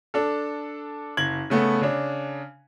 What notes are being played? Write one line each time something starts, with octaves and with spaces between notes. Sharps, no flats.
D4 A4
F#1 G#6 F#7
C#3 A3 B3
C#3 D4